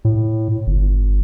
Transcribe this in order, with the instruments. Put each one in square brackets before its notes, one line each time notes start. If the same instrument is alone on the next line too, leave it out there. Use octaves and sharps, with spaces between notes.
[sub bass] A2
G1